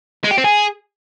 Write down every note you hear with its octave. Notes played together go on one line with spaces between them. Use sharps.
G#3
G4
C4
G#4